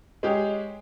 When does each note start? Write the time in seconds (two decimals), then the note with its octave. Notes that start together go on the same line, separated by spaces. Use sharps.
0.23 G#3 G4 G#4 C#5